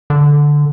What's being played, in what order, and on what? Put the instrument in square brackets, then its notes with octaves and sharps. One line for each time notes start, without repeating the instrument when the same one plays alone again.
[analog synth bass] D3